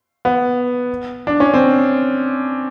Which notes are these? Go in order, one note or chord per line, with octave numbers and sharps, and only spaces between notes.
B3
D4
C#4
C4